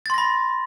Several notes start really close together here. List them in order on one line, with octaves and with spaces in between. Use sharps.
A6 C6 A#6 B5